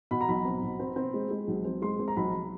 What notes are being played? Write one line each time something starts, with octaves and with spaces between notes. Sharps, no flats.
B2 B5
A#5
B1 B5
C4
B2
C4
C4
G#3
G#3
B1
C4
G#3 C6
C4
A#5
B1 B5